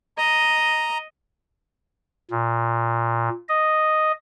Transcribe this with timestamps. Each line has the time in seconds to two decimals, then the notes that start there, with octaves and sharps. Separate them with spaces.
0.18 D#5 A#5
2.31 A#2
3.49 D#5